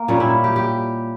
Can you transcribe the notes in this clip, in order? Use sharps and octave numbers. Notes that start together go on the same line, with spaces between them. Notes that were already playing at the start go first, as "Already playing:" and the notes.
Already playing: A#3
A#2 G3 C#4
E4
G4
G4